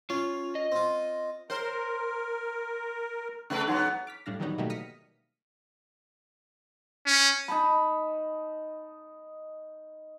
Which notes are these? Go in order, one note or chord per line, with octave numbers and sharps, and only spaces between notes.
C#4 F4
D#5
C4 F4
A#4 C5 C#5
C#3 A3 C#4 B4
G#2 F#3 B3 D#4 F#5 C6
D6 F6 B6
A2 G3 D4 F5 A#6
D#3 E3 F#3 G3 B3 D#4
B2 D#3 F#3 G3 A3 A#3
D#6 F6 A#6 B6 C#7 D#7
C#4
D#4 A5 B5